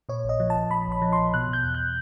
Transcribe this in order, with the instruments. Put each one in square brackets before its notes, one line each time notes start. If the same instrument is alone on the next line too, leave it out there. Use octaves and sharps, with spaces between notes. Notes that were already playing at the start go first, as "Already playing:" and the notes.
[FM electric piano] A#2 C#5
A#1 D#5
F3
A5
A#1
A#2 B5
A#1 B5
F3
C6
A#1
B2 F#6
B2 G6
E2
F#6